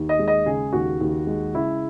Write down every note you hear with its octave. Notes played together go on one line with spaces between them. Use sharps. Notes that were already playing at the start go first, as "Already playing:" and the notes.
Already playing: D#2
D#5
G#3
D#5
C#3 G#4
D#2 F#4
D#2
G#3
C#3 E4